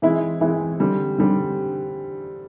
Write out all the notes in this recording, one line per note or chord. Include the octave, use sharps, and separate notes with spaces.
E3 G#3 C4 E4
E3 G#3 C4 E4
D3 G3 C4
D3 G3 C4